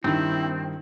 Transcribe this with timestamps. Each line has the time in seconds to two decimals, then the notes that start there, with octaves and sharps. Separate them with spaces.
0.04 G2 D#3 C4 E4